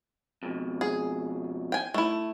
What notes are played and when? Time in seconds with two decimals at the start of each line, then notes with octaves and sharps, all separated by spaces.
0.43 F2 B2
0.81 G#4
1.72 G5 G#5
1.94 A3 E4